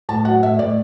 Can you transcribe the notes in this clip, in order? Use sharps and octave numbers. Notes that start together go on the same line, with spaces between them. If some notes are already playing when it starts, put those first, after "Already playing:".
A2 A5
F#3 F#5
A2 E5
A2 D5